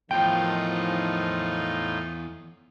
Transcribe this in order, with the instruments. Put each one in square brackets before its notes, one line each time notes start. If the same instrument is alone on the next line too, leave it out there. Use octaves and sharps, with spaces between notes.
[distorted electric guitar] E2 [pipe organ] A2 D#4 F4 [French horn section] D#3 F3 [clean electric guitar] G5